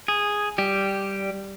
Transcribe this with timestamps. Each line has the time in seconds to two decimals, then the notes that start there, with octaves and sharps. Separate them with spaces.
0.08 G#4
0.58 G3 G4